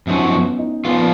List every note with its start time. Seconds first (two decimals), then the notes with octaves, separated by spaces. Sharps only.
0.07 F#2 F3 C#4 D#4 F#4
0.33 B3
0.59 D#4
0.85 A#2 F3 B3 F4 B4